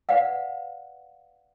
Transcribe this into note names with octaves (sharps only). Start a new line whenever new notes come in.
B4 D5 F5 F#5